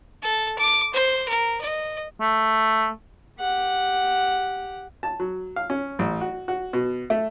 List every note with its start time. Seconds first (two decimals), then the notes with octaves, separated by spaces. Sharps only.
0.22 A4
0.58 D6
0.94 C5
1.29 A#4
1.61 D#5
2.20 A3
3.40 G4 F#5
5.03 A5
5.20 F#3
5.56 F5
5.70 C#4
5.99 A1
6.21 F#4
6.48 F#4
6.73 B2
7.10 A3